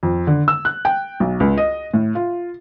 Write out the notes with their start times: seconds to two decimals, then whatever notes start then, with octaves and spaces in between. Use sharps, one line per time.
0.03 F2
0.27 D3
0.48 E6
0.65 F#6
0.85 G5
1.20 B1
1.40 C#2
1.58 D#5
1.94 A2
2.15 F4